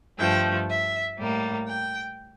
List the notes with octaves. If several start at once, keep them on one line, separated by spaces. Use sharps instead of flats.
G2 F3 A3 G5
E5
A2 G3 A#3
G5